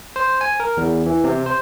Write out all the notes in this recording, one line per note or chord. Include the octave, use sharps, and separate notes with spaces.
C5
G#5
A#4
E2
E3
C3
C5